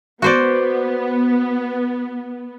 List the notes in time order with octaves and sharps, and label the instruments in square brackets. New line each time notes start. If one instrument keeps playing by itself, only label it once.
[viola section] B3 [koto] F#4 C5 D5